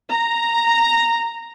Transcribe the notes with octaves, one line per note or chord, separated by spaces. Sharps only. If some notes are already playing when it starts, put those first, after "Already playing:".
A#5